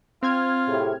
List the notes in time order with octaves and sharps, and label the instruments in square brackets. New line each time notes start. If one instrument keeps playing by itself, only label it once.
[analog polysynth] C4 F6 G#6 [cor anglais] F4
[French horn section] A2 C3 G#4